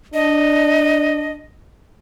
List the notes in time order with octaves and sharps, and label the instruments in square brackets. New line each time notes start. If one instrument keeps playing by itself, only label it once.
[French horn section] D4 [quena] D#5